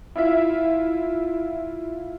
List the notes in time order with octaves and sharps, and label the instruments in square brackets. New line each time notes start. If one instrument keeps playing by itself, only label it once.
[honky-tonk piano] E4 F4 E5